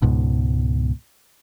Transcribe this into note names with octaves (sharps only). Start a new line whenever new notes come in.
C#2 G#2 B2